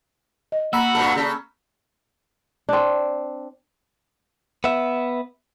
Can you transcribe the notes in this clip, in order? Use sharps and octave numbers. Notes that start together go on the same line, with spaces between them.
D#5
A#3 F#4 A#5 B5 E6
G2 A#2 A4
C#3 A4
C4 D4
B3 E5